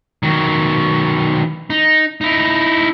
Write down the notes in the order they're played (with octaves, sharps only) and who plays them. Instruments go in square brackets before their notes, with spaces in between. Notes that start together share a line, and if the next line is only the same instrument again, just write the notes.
[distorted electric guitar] D#3 F#3
D#4
D#4 E4